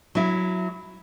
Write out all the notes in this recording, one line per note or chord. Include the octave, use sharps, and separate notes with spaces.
F#3 E4